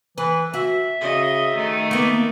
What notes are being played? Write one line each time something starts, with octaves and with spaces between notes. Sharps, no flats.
E3 B4
F#4 E5
C#3 D#5
D#3 A3
A#3 B3